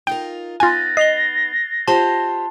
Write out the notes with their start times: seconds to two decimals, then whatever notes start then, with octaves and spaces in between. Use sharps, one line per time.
0.07 D#4 F4 A#4 G5
0.60 B3 D#4 F4 B4 G#5 F#6 A6 A#6
0.97 D#5 C7 F7 G7
1.88 F4 G4 C5 A5 C6